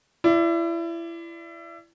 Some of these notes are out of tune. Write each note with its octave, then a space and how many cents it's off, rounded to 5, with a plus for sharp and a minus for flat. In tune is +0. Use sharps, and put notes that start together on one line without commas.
E4 +30 D5 +0